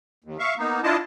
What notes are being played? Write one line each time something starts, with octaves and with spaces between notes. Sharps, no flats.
D#2
E5 F5 C#6
A#3 B3 D#4
D4 E4 F4 D#5 A5